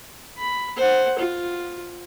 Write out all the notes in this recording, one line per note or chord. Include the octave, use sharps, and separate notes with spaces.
B5
C5 F#5
F4